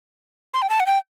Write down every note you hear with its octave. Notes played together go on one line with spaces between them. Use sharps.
C6
G5
A5
F#5
G5